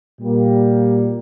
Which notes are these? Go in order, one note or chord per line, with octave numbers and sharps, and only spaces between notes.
A#2 G3 A#3